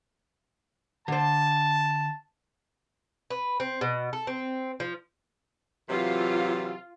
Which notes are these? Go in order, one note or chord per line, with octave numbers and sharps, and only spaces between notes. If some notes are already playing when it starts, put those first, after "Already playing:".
D3 C5 A5
B4
C4
B2
A4
C4
F3
C3 E3 F#3 F4